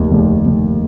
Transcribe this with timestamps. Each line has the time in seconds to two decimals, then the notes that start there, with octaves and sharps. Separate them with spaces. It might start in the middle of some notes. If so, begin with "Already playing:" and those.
Already playing: F1 D#2
0.11 F1
0.45 F1